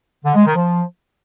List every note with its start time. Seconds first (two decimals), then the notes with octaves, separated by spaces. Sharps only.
0.24 D3
0.35 G#3
0.45 D#3
0.56 F3